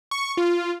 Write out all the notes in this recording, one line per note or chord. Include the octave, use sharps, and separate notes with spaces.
C#6
F4